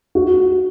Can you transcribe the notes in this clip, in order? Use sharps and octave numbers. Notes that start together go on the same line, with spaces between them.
F#4